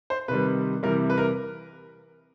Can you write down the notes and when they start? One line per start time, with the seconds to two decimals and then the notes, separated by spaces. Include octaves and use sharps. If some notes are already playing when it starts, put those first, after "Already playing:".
0.10 C5
0.28 C3 D#3 G3 B4
0.83 C3 E3 G3 A#4
1.10 B4
1.18 A#4